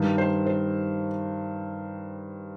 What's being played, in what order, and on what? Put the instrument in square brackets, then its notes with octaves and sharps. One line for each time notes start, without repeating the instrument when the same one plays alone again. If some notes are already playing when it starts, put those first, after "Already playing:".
Already playing: [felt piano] G2 D#3
C5
C5